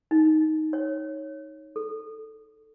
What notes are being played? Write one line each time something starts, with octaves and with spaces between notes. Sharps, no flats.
D#4
C#5
A4